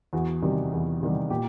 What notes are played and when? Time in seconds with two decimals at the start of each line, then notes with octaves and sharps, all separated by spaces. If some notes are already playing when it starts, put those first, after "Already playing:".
0.13 E2 F#4
0.42 C3 D#3 G3
0.72 E2
1.01 C3 D#3 G3
1.30 A#2 G4